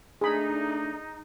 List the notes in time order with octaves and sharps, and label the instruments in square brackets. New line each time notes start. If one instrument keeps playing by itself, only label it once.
[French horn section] A3 D4 [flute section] D#4 [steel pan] G#4 B5